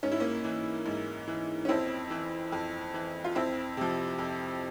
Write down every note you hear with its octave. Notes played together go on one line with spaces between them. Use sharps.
G#2 C#4
E4
A#3 C#4
E3
G#2
E3
C#4
F2 C4 E4
E3
F2
E3
F4
F2 C4 E4
C3 F3
F2